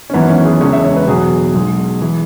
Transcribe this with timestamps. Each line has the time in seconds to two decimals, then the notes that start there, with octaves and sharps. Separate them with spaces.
0.10 C#4
0.13 G#1 F#2 E3 B3
0.29 C#4
0.45 G#4
0.61 E1 E2 C#3 G#3 C#5
0.73 E5
0.84 C#5
0.96 B4
1.08 E2 B2 F#3 G#4
1.55 B1 B2 G#3
2.01 E3